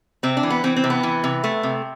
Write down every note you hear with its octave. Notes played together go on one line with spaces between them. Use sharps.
C3 C4
D4
E3
B3
E3 C4
C4
C3
B3
E3
C3
A3
C3